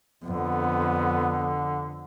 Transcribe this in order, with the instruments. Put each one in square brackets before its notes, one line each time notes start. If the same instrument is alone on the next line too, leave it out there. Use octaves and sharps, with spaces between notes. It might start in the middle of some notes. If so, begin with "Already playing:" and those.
[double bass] F2 [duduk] D3 [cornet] B3